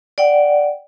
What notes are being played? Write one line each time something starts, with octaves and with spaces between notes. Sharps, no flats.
D5 F#5 G5